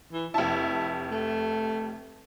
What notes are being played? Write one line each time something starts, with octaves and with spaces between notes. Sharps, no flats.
E3
F1 E4 A5
A3